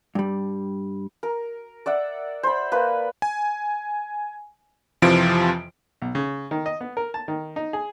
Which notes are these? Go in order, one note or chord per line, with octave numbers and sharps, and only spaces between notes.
G2 G3
A#4
D5 E5 F#5
C5 B5
A#3 B4
G#5
F2 C3 E3 F3 F4 D7
B1
C#3
D#3
D#5
B3
A#4
A5
D#3
D#4
G#4